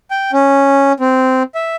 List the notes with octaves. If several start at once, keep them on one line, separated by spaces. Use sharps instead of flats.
G5
C#4
C4
E5